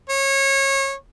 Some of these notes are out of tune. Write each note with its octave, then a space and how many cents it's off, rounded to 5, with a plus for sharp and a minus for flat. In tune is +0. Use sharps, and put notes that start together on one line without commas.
C#5 -25